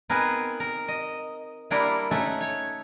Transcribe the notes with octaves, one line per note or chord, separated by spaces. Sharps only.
B3 C4 D#4 G#4 A#4 B4
A#4
D#5
G3 A#3 D4 E4 F4 A#4
A3 C#4 D#4 A4 E5 F#5
C#5